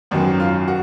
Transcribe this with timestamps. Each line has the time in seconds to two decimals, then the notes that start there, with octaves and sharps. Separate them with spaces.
0.11 G#1 F#2 D#3 F#3 B3
0.40 F4
0.68 F#4